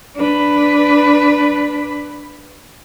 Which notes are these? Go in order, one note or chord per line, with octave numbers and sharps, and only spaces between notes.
D4 B4